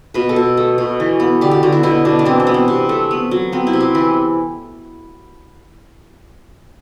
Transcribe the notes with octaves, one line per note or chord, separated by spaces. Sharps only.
B2 B4
A4
B2
A3
B2
E3
B3
D3 G4
G4
D3 F#4
E4
B2 E4
B2 D4
D4
E3 C4
C4
B3
C4
C3
A3
B3
F#3
B3 C4
E4
C3
G4
E3 B4